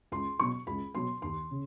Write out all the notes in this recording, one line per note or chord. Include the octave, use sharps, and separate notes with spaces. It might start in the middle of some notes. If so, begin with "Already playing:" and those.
C#2 C6
B2 F#3 B3 C#6
C#2 B5
B2 F#3 B3 C6
D#2 C6
C#3